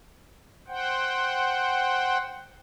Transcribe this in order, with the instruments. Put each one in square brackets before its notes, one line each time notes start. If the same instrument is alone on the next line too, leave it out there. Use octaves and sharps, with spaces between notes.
[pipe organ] C5 F#5 G5